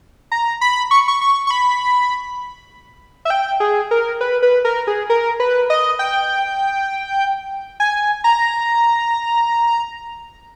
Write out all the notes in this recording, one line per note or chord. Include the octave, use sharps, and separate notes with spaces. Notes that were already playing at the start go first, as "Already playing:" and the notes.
A#5
B5
C#6
C#6
C#6
C#6
B5
E5
G5
G#4
A#4
B4
B4
A#4
G#4
A#4
B4
D#5
G5
G#5
A#5